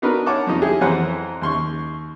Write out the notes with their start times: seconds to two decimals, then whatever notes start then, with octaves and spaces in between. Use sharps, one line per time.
0.02 B3 D4 D#4 F#4 A#4 B4
0.26 C#5 F#5 A5 D6
0.47 F2 F3 C#4 D#4
0.62 E4 G4 G#4
0.81 F2 E3 B4 C5 F#5 A#5
1.42 D#2 C6 C#6